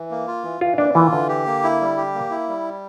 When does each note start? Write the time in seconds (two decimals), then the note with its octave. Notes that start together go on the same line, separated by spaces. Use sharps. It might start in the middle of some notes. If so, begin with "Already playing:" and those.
Already playing: E3
0.11 A#3
0.27 F4
0.44 E3
0.61 E3 F4
0.78 A#3 D4
0.95 E3 F4
1.12 D3 E3
1.29 G4
1.46 A#3
1.64 E4
1.81 G3
1.97 G4
2.15 A#3
2.31 E4
2.49 G3